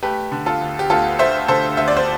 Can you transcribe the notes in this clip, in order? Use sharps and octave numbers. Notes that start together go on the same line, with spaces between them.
A3 G4 B4
D3
F4 A4
D2
G4
D2 F4 A4
A3 C5 E5
D3 A4 C5
D2 E5
D5
C5